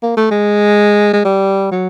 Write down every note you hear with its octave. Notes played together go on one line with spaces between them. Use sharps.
A#3
A3
G#3
G#3
G3
F#3